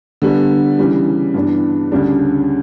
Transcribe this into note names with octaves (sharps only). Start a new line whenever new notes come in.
D3 G3 B3
C#3 E3 G3
G2 E3 B3 D4
D2 C#3 G3 D4